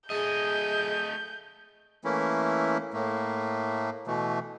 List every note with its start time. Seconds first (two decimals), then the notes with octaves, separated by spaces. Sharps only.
0.10 A3 G#4 D#5 G6
2.04 E3 A3 A#3 C#4 E4
2.93 A2 A3 A#3
4.07 B2 E3 A3